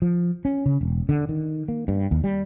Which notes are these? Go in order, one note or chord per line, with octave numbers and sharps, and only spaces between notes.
F3
C#4
C#3
E1
D3
D#3
A#3
G2
D#2
G3